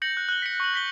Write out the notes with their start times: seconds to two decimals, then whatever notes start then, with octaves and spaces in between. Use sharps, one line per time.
0.02 G6 A#6 C#7 F#7
0.17 F#6
0.29 F#6 G7
0.42 B6 C#7
0.60 C#6 F#7
0.74 G6 B6 G7